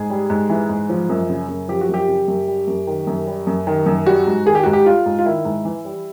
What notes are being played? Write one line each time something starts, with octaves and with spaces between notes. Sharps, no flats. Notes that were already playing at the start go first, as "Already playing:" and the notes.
Already playing: G#2 G#4
G3
G#2
E3
G#2
F3
F#2
C#3
F#2
F3 G4
F#4
F#2 G4
C#3
F#2
G3
F#2
D#3
F#2
G3
F#2
D#3
F#2
G3 F#4
G#2
D#3 G#4
G4
G#2 F#4
G4
G3 F4
G#2
F4
D#3 E4
G#2
E3
G3